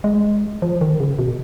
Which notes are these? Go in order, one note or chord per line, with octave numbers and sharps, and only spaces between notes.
G#3
F3
D#3
C#3
B2